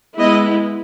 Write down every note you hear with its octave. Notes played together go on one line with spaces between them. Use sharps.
G#3 B3 E4 D#5